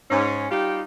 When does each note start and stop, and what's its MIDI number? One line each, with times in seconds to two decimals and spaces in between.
0.11 0.48 44
0.11 0.48 61
0.51 0.82 55
0.51 0.82 63
0.51 0.82 65
0.51 0.82 67
0.51 0.82 77
0.51 0.82 79